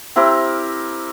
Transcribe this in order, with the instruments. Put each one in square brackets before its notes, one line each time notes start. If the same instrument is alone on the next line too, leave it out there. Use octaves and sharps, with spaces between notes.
[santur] C4 E4 G4 A#4